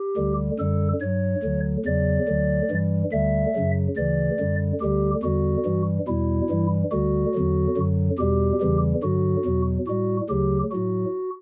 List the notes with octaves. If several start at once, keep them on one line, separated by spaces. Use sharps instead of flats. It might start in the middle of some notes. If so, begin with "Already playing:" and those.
Already playing: G4
D2 D3 G3
F#2 D3 G3 A4
G2 F#3 C#5
D2 D3 F#3
E2 C#3 F#3 D5
D2 D3 F#3
G2 E3 G3
D2 D3 G3 E5
F#2 C#3 F#3
D2 C#3 E3 D5
F#2 D3 G3
D2 D3 G3 G4
E2 D3 G3 F#4
G2 E3 G3
E2 B2 G3 E4
G2 E3 G3
D2 D3 G3 F#4
E2 D3 F#3
F#2 D3 F#3
E2 B2 G3 G4
E2 C#3 E3 G3
G2 D3 F#3 F#4
E2 B2 F#3
A2 G3 F#4
D2 C#3 F#3 G4
A2 F#3 F#4